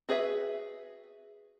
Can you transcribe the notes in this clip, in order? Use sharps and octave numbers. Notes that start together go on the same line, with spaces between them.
F#4 G#4 B4 D#5 E5